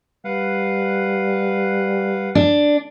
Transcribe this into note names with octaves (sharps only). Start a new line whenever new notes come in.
G3 B4 F5 F#5
D4